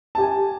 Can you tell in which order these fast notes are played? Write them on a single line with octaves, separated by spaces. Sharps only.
A5 G4 G#5